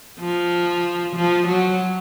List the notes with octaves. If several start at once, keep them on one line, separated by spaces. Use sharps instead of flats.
F3
F3
F#3